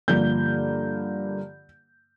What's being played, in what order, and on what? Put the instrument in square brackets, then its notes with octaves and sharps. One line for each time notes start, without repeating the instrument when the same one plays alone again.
[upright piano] G2 D3 F3 A#3 G6